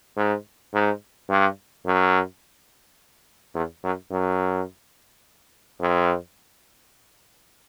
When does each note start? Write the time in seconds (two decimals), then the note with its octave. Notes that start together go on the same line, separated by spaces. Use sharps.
0.17 G#2
0.74 G#2
1.29 G2
1.86 F#2
3.55 E2
3.84 F#2
4.11 F#2
5.80 F2